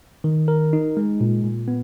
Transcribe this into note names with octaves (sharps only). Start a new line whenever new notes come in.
D#3
A#4
D#4
G#3
A#2
A#2
B3